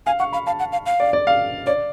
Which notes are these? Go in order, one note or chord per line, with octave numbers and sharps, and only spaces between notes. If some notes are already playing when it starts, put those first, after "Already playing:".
F5 G#5
F#5 C#6
F5 B5
F5 A5
F#5
F5
F5
D5
D5
F5
C#5 D5